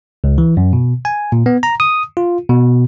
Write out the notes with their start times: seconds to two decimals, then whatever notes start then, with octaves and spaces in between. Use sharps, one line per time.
0.24 C#2
0.38 E3
0.57 F#2
0.73 B2
1.05 G#5
1.32 A#2
1.46 B3
1.63 A#5
1.80 D#6
2.17 F4
2.49 B2